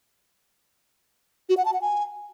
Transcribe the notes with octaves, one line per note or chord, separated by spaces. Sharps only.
F#4
F#5
A5
F#5
G#5